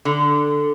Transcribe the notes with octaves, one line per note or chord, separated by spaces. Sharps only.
D3